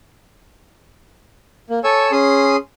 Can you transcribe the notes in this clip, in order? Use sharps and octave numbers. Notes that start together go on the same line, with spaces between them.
A#3
A4 C#5 G#5 E6
C#4 G#4 C6 D#6